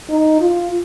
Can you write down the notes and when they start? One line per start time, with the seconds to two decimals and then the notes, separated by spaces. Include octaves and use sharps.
0.09 D#4
0.40 F4